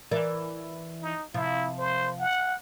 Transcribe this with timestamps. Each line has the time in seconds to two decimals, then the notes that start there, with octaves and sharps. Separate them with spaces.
0.11 E3 A#4 D5
1.02 D#4
1.34 C3 F3 E4
1.78 C5
2.20 F#5